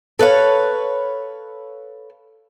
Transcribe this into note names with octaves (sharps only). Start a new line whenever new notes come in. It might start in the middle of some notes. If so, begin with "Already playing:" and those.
A4 B4 C#5 F5